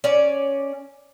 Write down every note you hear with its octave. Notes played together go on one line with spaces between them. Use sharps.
C#4 D5